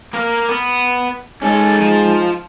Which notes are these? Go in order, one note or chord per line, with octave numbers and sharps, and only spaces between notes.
A#3 A#4
B3
G#3 C#4 D#4 A4
F3 A5